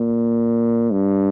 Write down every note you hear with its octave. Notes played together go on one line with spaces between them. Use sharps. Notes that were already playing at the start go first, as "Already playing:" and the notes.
Already playing: A#2
G2